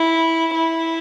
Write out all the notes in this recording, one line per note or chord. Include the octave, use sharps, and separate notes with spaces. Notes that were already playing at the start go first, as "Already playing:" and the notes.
Already playing: E4
E4